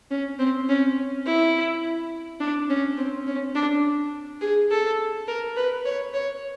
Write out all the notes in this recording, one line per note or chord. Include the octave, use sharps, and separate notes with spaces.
C#4
C4
C#4
E4
D4
C#4
C4
C#4
D4
G#4
A4
A#4
B4
C#5
C#5